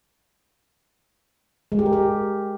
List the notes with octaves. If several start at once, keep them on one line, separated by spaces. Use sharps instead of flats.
G#3
G4
A#4
G4